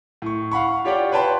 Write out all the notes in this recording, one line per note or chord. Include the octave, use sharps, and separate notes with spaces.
A2 C#6
F5 F#5 B5 C#6
F4 G4 C#5 D5 F#5 G5
B4 C#5 G5 A5 B5 C6